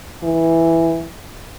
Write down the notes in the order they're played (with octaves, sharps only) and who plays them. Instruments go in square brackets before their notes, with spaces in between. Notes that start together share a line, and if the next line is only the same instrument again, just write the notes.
[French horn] E3